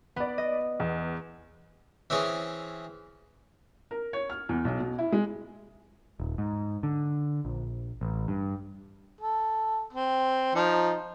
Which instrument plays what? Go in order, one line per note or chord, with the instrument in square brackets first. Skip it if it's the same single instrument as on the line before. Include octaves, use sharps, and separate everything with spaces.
[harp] B3 [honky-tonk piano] D5 B5
[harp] D#5
[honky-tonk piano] E2
[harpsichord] E3 C4 C#4 G#4
[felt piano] A#4
C#5
F6
E2
B1
B2
E4
G#3
[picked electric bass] D#1
G#2
D3
A#1
A1
G2
[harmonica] A4
C4
F3 D#4